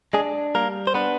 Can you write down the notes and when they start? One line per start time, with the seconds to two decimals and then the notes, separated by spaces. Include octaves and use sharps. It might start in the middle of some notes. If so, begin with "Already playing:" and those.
0.13 G#3 D4 G#4
0.55 G3 A#3 A#4
0.87 C5
0.94 B3 D4 B4